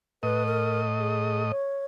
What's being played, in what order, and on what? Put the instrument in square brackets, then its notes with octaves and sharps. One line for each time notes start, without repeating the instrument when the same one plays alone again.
[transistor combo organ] A2 D#5 [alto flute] B4
[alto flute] A#4
G#4
C#5